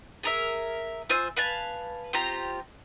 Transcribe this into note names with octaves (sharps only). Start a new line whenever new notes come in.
G#4 A#4 E5
F4 C5 G#5 E6
B4 F5 G#5 A5
C4 F4 G4 A#5